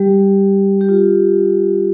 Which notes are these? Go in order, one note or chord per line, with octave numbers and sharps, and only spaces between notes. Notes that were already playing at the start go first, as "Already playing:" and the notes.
Already playing: G3 G4
G4
F4